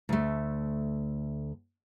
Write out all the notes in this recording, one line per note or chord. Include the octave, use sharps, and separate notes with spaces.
D2 A3